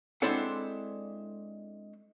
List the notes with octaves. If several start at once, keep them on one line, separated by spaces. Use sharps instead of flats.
G#3 C4 D4 E4 A4 F#5